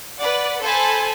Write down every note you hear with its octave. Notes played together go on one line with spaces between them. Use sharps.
B4 D5 F#5
A4 C5 G#5 A5 B5